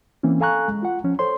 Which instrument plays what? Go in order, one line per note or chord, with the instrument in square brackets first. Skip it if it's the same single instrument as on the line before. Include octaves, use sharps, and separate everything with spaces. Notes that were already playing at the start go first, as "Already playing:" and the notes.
[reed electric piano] E3 A#3 C4 C#4
A4 F5 G#5 A#5 C#6 F#6
G#3
F4 F#5
F3 C#4
A4 C5 C#5 C6